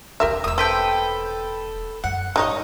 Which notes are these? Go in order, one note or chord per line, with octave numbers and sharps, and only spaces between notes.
D#2 C3 G4 A#4 E5
E1 D#6 E6
C4 A4 B4 G5
F#2 F#5
E1 G#2 G3 D#4 C#5 D#5